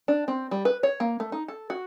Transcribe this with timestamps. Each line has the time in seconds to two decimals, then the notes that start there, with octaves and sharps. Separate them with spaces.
0.08 D4
0.28 C4
0.51 G3
0.65 B4
0.83 C#5
1.00 A#3
1.20 A3
1.32 D#4
1.48 A4
1.70 F#4